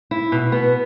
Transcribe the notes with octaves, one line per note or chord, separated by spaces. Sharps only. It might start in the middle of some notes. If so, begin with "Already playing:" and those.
E4
B2
B3